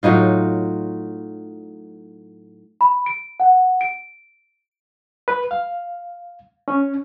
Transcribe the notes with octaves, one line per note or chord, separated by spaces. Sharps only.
A2 F#3 D#4 F4
B5
D7
F#5
D7
B4
F5
C#4